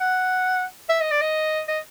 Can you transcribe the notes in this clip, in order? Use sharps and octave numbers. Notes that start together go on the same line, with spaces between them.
F#5
E5
D#5
D5
D#5
D#5